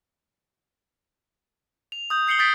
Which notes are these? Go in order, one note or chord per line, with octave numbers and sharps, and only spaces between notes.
F7
D#6 G6
G6 C7 C#7 F#7 G7
D#6 G6 A6 B6 D7